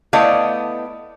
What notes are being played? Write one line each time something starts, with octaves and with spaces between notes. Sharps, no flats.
A3 B3 E4 D5 D#5 F5